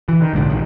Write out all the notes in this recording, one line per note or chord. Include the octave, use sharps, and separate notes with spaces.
E3
D#3
A#1 G#2 D3
D#3